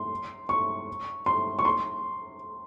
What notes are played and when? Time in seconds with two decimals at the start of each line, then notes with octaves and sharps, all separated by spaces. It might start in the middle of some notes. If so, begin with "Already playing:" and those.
Already playing: C6
0.49 C#6
1.26 C6
1.59 C#6
1.65 C6